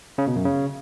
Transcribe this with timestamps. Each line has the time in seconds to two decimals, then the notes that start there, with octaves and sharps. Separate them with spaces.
0.18 C#3
0.27 B2
0.36 F#2
0.45 C#3